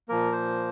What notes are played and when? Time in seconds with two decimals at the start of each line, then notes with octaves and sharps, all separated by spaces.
0.09 A#2 F3 A#3 A#4
0.32 C5